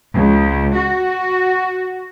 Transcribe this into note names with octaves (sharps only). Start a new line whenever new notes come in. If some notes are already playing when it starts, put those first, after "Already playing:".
C#2
F#4